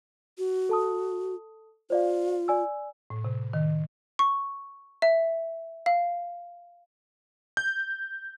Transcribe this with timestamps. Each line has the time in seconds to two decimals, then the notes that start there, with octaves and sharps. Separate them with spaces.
0.38 F#4
0.69 A4 A5 D#6
1.90 F4 C5 D5 F5
2.48 D5 G#5 E6
3.10 A2
3.25 C3
3.53 D#3
4.19 C#6
5.02 E5
5.86 F5
7.57 G6